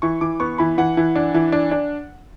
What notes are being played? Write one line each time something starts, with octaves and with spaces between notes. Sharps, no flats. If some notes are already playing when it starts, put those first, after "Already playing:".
E3 C#6
E3 D6
B3 C#6
E3 B5
E3 F#5
E3
D4
E3
D4
D4